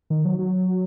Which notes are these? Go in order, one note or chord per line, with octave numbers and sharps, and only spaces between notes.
D#3
F#3
F#3